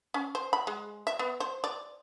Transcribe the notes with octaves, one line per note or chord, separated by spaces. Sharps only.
C#4
C5
B5
G#3
E5
B3
C5
D5